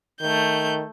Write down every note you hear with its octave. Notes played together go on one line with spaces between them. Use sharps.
D#3 A3 G6